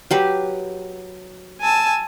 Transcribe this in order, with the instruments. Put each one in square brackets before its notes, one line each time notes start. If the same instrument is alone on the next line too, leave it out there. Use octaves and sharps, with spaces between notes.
[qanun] F#3 G4 B4
[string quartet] G#5 A5 E6